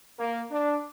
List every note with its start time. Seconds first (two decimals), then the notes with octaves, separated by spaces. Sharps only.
0.19 A#3
0.52 D4